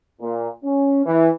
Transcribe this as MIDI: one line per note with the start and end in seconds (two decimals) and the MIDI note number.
0.21 0.49 46
0.65 1.06 61
1.06 1.29 52